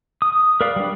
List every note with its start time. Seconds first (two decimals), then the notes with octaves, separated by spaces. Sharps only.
0.22 D#6
0.61 A#4 B4 D5 F5
0.76 G3 D4